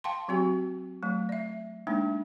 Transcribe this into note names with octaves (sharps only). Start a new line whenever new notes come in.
F5 G5 A5 C6
F#3 C4 F#4 G4
F#3 A3
D5 E5
G#3 A#3 D4 D#4